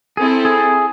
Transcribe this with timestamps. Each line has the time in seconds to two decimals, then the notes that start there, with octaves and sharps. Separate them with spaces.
0.17 C4 E4 G#4 A4
0.45 G#4